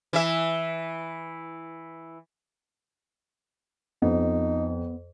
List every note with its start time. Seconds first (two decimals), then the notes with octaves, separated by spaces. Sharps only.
0.13 E3 E5
4.02 F2 B3 D#4